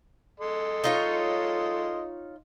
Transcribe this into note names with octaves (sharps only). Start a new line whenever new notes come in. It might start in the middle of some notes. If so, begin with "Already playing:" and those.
A4 D#5 C6
D#4 F4 C#5